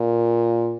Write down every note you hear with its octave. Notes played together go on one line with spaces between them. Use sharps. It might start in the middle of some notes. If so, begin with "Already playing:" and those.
Already playing: A#2